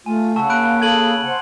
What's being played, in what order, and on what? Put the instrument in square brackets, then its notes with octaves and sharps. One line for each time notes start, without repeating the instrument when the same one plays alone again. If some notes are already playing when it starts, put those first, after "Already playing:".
[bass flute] A3 [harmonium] F4 [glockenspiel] G#5
[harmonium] C#3 [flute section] F#5 G#5 [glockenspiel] A5 C#6 E6
[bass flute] A#3 [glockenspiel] B5 F#6 D7
[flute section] G#4 A4 [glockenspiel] G#6 D#7 F#7
[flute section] C5 F#5